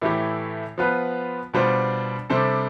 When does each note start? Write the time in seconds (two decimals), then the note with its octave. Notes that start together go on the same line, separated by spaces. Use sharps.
0.02 A2 E3 A3 E4 G4
0.78 F3 B3 F4 B4
1.54 B2 G3 D4 F4 C5
2.30 C3 G3 D4 A4 C5